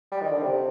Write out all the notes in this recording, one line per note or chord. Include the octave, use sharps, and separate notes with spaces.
G3
D#3
D3
C3